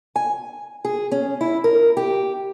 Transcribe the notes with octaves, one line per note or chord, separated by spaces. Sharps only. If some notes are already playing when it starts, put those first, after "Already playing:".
G#5
G#4
C#4
E4
A#4
G4